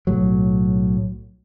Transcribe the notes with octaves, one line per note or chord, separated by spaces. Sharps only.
B1 A2 F#3